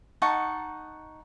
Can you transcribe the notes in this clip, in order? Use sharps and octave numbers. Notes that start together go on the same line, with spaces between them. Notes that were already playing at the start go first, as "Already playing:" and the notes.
D#4 F#5 A5 C#6